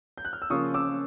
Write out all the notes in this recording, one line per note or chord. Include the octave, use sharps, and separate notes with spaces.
G6
F#6
F6
E6
C#3 F3 A#3 C#4 F4 C#6 D#6
D6 E6